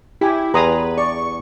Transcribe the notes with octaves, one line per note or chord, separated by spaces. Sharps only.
E4 G4 G#5
E2 G#4 B4 A#5 C6 D#6
D5 C#6